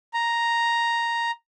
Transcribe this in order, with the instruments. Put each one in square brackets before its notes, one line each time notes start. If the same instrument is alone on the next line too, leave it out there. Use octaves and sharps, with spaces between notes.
[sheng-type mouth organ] A#5